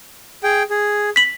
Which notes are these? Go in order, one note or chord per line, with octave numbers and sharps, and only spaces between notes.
G#4 G5
G#4
B6 F#7